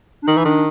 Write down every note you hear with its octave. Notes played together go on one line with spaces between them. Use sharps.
D4
D#3 D#4
E3
D#3 D4